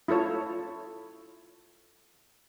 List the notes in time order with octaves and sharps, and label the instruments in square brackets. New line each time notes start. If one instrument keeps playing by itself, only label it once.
[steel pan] E4 F4 A4 C#5